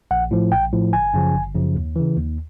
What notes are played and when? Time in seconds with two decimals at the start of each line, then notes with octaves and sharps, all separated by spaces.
0.11 A#1 F#5
0.31 A2 F3
0.52 A#1 G5
0.73 A2 F3
0.93 G1 G#5
1.14 F#2 C#3 F3
1.34 G1
1.55 F#2 C#3 F3
1.75 D#2
1.96 C#3 E3
2.16 D#2